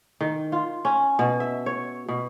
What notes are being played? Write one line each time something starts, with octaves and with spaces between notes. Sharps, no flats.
D#3
F4
C#4
B2
E5
C#5
B2